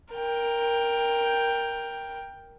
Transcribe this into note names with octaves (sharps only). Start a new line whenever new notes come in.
A#4 G5